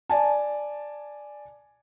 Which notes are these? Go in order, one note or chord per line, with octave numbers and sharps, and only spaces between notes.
D5 G#5 A5